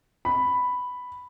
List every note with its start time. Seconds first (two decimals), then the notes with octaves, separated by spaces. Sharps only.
0.25 B5